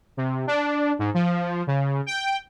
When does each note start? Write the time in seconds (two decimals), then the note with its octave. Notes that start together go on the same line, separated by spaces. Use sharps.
0.17 C3
0.47 D4
0.99 G#2
1.14 F3
1.67 C#3
2.06 G5